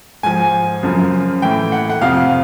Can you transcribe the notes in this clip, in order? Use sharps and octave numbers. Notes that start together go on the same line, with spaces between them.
G#2 F3 G#5
F#2 C#3 F3
A2 E3 G5
F#5
F#5
F2 C3 F3 F5